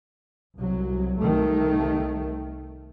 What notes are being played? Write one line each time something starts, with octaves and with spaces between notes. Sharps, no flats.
C2 F#3
C2 D#3 A3